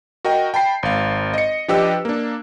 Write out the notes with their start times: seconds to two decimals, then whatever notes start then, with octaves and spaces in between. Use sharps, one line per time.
0.25 F#4 A#4 D#5 G5
0.54 G5 A5 B5 C7
0.83 G#1 F5
1.34 D#5 C#7
1.68 F3 D4 G4 B4 D#5 E6
2.05 A#3 D4